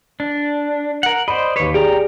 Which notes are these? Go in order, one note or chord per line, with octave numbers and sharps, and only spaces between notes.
D4
A#4 F#5
C5 D5 D#5 B5
D#2 B4 C#5 D6
G4 G#4 D5 G5 A#5